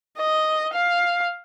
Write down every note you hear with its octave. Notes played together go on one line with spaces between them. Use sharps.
D#5
F5